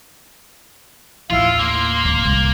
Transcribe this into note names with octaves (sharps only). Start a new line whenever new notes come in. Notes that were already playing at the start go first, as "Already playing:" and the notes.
A1 D#2 E4 F4 F5
A#3 C6
D1
C2